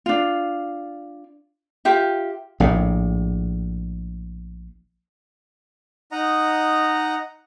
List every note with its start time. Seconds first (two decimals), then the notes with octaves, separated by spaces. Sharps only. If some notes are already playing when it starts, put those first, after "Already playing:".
0.06 D4 F4
1.85 F4 G4 E5
2.60 A#1 A2
6.12 D#4 D#5 F#5 A#5